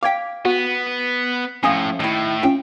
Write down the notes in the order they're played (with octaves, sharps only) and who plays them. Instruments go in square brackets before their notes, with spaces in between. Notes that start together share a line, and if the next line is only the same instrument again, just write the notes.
[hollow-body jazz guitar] F5 G5 [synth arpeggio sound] D6 G#6 B6
[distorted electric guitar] B3 [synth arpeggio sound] F#4
[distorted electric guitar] A2 [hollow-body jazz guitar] F3 A3 C#4 [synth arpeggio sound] G#5 D#6
[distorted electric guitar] A2 [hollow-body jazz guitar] D#3 E4
[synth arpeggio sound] C#4 F4 [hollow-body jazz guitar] G5